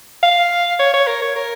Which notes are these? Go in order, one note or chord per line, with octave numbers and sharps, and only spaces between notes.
F5
C#5
C#5
A#4
C#5
A#4